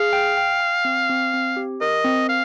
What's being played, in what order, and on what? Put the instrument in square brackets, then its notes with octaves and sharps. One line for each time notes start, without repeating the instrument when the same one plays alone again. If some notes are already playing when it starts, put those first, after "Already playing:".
Already playing: [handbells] G#4 [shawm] F5
[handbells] G5
G5
G5
C4
C4
C4
G4
[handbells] A#4 [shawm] D#5
[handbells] C4
[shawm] F5